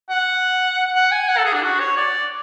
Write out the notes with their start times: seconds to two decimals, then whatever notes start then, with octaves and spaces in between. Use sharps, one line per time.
0.10 F#5
0.95 F#5
1.12 G#5
1.29 F#5
1.38 A4
1.45 G#4
1.53 D4
1.63 F#4
1.80 C#5
1.97 D5